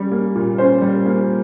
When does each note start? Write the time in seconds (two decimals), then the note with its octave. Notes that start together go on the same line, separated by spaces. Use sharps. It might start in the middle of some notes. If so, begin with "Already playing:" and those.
Already playing: G3 C#4
0.11 A#3
0.36 A#2
0.58 C#4 C5
0.82 G3
1.06 A#3